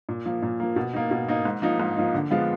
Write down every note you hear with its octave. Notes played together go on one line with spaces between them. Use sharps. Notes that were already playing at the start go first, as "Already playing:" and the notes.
A#2
F3 A#3
A#2
F3 A#3
B2
A#3 D#4
B2
A#3 D#4
G#2
F3 A#3 D#4
G#2
F3 A#3 D#4
D3
F3 G#3 B3 F4